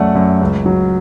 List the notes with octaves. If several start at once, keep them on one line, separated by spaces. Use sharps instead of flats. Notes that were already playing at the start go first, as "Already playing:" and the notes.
Already playing: F#2 A3 D5 F#5
F#2
C#2
F#3